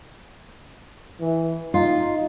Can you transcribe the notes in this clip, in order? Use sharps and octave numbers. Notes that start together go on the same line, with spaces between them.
E3
D#4 F4